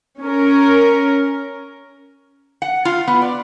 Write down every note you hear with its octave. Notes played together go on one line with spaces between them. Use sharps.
C#4 A#4
F#5
F4
B3
D5